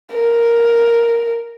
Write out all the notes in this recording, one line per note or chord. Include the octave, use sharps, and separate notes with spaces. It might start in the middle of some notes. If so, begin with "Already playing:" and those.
A#4